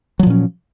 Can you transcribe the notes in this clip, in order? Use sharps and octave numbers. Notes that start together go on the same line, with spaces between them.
A#2 F3 F#3 C#4